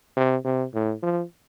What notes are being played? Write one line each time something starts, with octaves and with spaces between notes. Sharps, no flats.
C3
C3
A2
F3